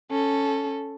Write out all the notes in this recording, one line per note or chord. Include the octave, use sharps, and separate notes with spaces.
C#4 A4